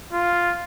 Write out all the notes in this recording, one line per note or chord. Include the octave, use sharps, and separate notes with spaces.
F4